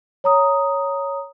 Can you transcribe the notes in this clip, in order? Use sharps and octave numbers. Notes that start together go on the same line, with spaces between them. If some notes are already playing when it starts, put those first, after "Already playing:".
C#5 A#5 D#6